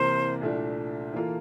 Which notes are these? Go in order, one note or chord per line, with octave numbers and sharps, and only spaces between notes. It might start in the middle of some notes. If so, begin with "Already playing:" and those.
Already playing: C2 C3 E3 A#3 C5
C2 A#2 A3 D4
E3 A#3 F4 A4